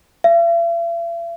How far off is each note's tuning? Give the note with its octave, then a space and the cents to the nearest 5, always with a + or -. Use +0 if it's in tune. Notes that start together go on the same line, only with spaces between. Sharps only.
E5 +45